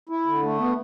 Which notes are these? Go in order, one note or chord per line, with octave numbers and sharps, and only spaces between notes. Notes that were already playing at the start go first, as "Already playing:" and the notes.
E4
D3
A3
B3